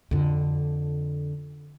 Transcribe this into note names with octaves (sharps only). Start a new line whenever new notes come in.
F2 D3